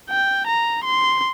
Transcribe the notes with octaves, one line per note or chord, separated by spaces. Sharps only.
G5
A#5
C6